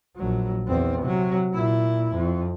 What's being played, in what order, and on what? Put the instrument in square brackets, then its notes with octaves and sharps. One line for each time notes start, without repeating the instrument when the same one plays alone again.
[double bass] A#1 F#3
E2 C4
C3 F#3
A#2 E4
F2